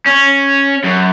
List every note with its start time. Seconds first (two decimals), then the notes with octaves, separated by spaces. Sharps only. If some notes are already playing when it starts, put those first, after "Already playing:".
0.06 C#4
0.84 F#2